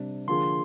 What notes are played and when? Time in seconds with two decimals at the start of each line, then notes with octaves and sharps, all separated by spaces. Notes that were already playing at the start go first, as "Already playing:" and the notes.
Already playing: C3 G3 D4
0.27 D3 F3 A#3 F4 G#4 C6